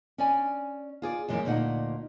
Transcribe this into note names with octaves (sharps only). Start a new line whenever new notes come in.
C#4 D5 G#5
F4 G#4 D5
F#2 E3 G#3 A#3 D5
D2 A#2 D#4 F#5